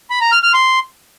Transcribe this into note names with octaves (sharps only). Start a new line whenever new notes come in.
B5
A#5
F6
F6
C6